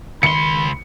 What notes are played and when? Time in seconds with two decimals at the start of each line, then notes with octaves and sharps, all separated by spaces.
0.23 C#2 D#3 B5 C6 C#7